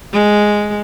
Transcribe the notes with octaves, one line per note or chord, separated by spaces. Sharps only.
G#3